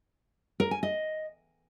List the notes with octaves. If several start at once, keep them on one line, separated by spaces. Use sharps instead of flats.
A#4
G#5
D#5